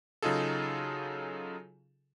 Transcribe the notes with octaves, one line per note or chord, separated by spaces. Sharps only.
C#3 F#3 D#4 F4 G#4 A4